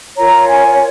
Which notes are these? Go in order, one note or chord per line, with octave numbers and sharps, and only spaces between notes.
F4 A#4 C#5 A#5
G#5